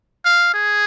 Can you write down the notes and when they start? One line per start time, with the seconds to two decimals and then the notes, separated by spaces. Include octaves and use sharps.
0.25 F5
0.54 G#4